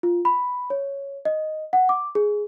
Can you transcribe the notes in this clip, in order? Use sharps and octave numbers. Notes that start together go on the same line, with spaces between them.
F4
B5
C#5
D#5
F#5
D6
G#4